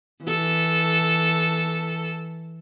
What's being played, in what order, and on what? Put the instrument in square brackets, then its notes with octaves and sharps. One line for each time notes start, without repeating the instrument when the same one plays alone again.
[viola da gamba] E3 A4